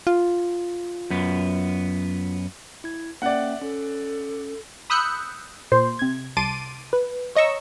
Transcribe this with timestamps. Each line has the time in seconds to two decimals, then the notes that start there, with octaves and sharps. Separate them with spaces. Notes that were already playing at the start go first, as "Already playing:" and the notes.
0.07 F4
1.10 F#2 B3
2.84 E4 G#6
3.22 A#3 C#4 D5 E5 F#5 G5
3.62 C#4 A4
4.90 B5 D#6 E6 F#6 G6 C#7
5.72 A#2 C5 C6
5.99 C3 G#6
6.37 C2 A5 C6 D6 D#7
6.93 B4
7.35 C#5 D#5 A#5 C#6 E6